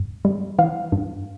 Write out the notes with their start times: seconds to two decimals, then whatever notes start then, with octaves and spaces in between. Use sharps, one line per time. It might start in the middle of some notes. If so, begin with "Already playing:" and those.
Already playing: G2
0.25 G3
0.58 E3 F5
0.92 G2